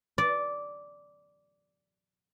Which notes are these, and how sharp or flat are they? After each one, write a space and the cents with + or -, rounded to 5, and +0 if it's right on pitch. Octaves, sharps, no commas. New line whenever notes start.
D5 -10